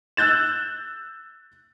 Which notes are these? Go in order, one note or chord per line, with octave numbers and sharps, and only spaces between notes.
E6 F#6 G6 A6 E7